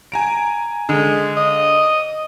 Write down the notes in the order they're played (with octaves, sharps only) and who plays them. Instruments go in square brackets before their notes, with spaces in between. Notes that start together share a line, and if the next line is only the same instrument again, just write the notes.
[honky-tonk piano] G#5 A#5 D7
[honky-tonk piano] D3 [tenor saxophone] G#3
[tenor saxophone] D#5